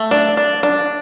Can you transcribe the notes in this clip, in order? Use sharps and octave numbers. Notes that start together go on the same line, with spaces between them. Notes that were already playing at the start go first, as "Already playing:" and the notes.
Already playing: A3
D4
D4
D4